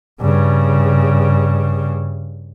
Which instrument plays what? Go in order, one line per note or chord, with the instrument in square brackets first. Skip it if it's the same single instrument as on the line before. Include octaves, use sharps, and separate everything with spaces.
[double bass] G2 C#3